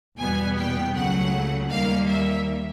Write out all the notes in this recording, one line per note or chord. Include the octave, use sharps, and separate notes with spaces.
E2 B2 G3 B3 G#5
G5
C#2 C#3 F#3 A3 F#5
D#2 D#3 G3 A#3 F5
E5